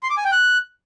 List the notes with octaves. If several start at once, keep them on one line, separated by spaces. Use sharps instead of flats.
C6
D6
G#5
G5
F#6